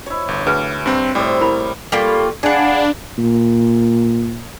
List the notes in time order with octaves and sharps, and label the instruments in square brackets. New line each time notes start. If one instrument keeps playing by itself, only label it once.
[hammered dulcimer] E4 C#5
[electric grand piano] G1
[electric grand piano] D2 [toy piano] G#4 B4
[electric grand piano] G2 C4
[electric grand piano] A2 [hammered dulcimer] G3 C4
[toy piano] E4 A#4 B5
[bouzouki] G3 A#3 F4 [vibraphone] A4 C#6
[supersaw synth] D4 [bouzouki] G#4 F#5 [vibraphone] F5 B5
[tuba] A#2